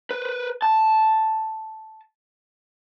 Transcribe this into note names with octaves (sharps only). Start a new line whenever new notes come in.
B4 C5
A5